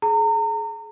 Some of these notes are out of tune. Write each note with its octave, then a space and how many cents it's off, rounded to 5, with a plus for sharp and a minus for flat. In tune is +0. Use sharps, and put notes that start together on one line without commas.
G#4 +35 A#5 -35